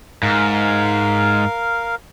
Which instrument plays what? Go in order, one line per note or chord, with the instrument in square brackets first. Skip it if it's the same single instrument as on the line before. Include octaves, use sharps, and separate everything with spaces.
[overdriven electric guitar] G#2 [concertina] A#4 F5